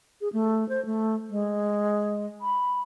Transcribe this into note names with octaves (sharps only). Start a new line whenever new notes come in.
G#4
A3
C5
A3
G#3
B5